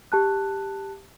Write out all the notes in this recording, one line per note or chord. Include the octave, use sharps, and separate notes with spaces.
G4 A5 F#6